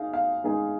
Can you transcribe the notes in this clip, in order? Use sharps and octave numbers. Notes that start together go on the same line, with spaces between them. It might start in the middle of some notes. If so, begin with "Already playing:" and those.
Already playing: D#4 G#4 F5
F5
G#3 D#4 G#4